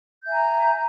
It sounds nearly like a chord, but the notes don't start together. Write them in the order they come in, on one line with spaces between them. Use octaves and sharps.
G6 E5 G#5 A#5